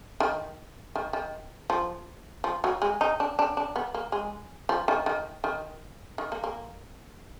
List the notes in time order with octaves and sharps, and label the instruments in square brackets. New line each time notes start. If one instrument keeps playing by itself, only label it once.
[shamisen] D#3
D#3
D#3
F3
F3
F#3
G#3
D#4
D4
D4
D4
B3
A#3
G#3
F3
D#3
D#3
D#3
D#3
A#3
A#3